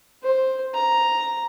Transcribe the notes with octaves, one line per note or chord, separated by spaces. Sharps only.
C5
A#5